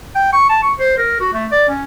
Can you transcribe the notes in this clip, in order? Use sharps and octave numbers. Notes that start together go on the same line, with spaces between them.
G5
C#6
A5
C#6
C5
A#4
F#4
A3
D5
C#4